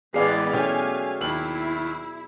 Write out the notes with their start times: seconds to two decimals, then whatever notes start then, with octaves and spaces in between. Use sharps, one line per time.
0.14 A1 E3 G#3 B3 G#4 D5 F5 C7
0.53 B2 A3 C#4 G4 F5 G#5
1.21 D#2 E4 F#7